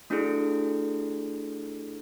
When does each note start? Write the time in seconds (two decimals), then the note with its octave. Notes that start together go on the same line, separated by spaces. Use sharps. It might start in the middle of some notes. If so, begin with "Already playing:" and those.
0.10 A3 D4 E4 F#4 G#4 A4